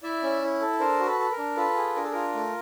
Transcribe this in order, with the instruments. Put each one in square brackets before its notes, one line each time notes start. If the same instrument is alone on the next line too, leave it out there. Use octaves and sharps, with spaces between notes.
[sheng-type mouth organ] E4 D5 E5
C#4
E4
A4
D4 A#4 C5
F#4
A4 B4
A4
A#4
D4
F4 A4 B4
G#4
D4 A#4
A4
F4 A#4
A3